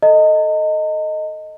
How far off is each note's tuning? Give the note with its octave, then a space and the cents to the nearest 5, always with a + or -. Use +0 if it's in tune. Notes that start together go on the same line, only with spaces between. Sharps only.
A4 +0 D#5 +0 A#5 -45